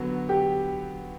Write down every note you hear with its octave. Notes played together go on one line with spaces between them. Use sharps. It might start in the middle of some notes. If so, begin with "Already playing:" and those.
Already playing: D3 F#3 B3 F#4
G4